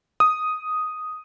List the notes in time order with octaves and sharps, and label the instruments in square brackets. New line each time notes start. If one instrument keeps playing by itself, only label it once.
[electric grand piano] D#6